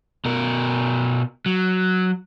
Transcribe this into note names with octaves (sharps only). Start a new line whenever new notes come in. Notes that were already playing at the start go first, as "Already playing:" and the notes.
B2 A#4
F#3